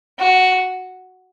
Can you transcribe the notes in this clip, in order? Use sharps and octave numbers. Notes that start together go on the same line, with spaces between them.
F#4